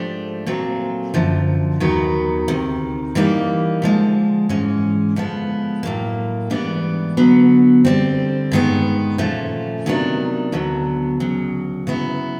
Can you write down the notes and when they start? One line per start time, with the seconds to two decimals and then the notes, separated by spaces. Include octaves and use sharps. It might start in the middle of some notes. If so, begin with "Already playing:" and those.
Already playing: G#2 F3 A3 D4 G4
0.46 A#2 F#3 A3 C4
1.14 F#2 D3 F3
1.80 D#2 D#3 F#3 B3
2.48 D2 C3 D#3
3.15 E3 G3 A#3 D#4 G4
3.82 D3 F3 G#3
4.49 G#2 E3 G#3 C#4
5.16 D3 F3 G#3 B3
5.83 A2 F#3 A#3
6.50 G#2 E3 G3 B3 D4
7.17 D3 F#3 B3
7.85 D3 G3 C4
8.52 G2 D#3 G#3 B3
9.18 A#2 F3 A3 C#4
9.86 C3 D#3 F#3 B3 D4
10.52 D2 D3 F#3 B3
11.20 D2 C#3 F#3
11.87 C#3 F#3 B3 E4